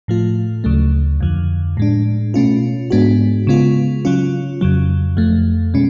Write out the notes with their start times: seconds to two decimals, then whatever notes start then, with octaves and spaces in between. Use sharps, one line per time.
0.08 A2 F3 A3 F4
0.64 D2 C#3 F#3 A3
1.21 F2 D3 F3
1.77 A2 G#3 D4
2.34 B2 A3 C#4 F4
2.91 G#2 G#3 B3 D4 F#4
3.47 C#3 G#3 B3 F4
4.05 C#3 F#3 C#4 F4
4.61 F2 C#3 F#3
5.17 F2 F3 A3
5.74 B2 G#3 C#4